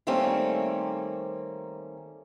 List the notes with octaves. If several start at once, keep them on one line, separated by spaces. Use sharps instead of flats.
D#3 G3 A3 A#3 C4 C#4